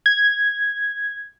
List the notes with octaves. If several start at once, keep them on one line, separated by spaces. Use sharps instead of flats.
G#6